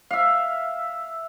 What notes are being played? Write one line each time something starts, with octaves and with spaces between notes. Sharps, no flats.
E5 F5